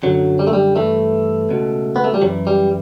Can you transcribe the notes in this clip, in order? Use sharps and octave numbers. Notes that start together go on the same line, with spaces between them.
F#2 D3 F#3
G3
A3
G3
G2 E3 A3
C#2 B2
B3
A3
G3
F#2 E3 F#3
G3